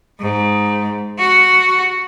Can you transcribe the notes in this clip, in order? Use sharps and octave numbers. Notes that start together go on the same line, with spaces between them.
G#2
F#4